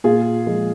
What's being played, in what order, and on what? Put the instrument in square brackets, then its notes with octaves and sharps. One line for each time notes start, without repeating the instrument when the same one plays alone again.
[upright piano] A#2 F4 G#4
F3 G#3